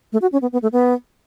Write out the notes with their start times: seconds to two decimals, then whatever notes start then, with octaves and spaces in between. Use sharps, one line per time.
0.13 A3
0.22 F#4
0.32 C#4
0.42 B3
0.53 B3
0.62 A3
0.72 B3